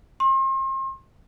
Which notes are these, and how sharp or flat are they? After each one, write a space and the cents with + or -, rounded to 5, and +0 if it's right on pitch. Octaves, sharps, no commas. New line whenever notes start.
C6 +40